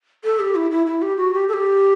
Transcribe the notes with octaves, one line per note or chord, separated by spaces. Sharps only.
A4
G4
E4
E4
E4
G4
F#4
G4
A4
G4